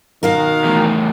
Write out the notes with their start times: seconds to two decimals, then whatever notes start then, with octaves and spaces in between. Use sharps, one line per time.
0.23 B2 D#3 F#4 A#4 F5
0.65 E2 A2